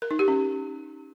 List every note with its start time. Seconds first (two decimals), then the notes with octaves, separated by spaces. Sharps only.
0.02 A#4
0.11 D#4
0.19 G4
0.28 C#4